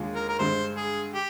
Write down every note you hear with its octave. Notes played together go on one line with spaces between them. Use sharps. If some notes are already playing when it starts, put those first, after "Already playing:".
Already playing: D#2 D3 G#3 F4
A#4
A#4
G2 D3 G#3 C5
G#4
G4